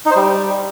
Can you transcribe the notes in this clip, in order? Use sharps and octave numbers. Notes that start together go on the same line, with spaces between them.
D#4
C5
G3